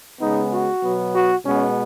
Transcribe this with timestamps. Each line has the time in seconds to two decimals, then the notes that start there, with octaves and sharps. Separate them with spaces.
0.19 C#3 G#3 B3 D#4
0.50 F#4
0.81 B2 F#3 B3
1.13 F#4
1.44 B2 G#3 B3 C#4